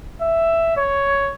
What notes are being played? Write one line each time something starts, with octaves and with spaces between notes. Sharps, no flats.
E5
C#5